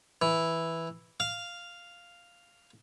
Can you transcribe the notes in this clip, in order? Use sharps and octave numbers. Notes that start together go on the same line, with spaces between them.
E3
F5